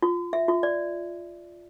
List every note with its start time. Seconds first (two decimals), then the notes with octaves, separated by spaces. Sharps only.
0.02 F4
0.33 E5
0.48 F4
0.63 D5